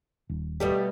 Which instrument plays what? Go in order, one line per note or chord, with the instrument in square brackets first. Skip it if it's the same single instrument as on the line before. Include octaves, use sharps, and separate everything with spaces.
[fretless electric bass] D#1
[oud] B2 G3 A3 [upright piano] G4